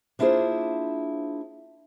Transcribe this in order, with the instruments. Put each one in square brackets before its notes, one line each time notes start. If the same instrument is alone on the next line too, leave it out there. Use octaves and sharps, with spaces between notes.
[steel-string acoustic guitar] A#3 D4 E4 F4 G#4 C5